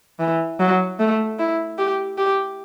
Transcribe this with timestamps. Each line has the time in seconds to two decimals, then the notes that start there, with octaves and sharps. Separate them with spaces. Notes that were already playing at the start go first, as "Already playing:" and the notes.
0.19 E3
0.60 F#3
0.99 A3
1.39 E4
1.78 G4
2.18 G4